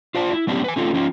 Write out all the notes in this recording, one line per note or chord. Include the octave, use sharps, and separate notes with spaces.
F4 C5 D5 A5
E4
F#3 B3 C#4 D4 E4 G4
B4 G#5
A3 C4 C#4 D#4 F4
F3 C#4 D#4 F4